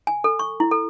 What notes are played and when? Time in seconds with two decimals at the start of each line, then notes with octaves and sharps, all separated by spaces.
0.07 G#5
0.24 A4
0.39 C#6
0.60 E4
0.71 A4